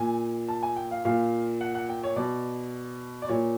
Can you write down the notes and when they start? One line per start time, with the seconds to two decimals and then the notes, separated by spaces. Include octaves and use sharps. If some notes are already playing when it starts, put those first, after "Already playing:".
Already playing: A#2 G#5
0.49 A5
0.63 G#5
0.77 G5
0.91 F5
1.05 A#2 F5
1.61 F#5
1.75 F#5
1.89 G5
2.04 C#5
2.16 B2 D5
3.22 D5
3.28 A#2 C#5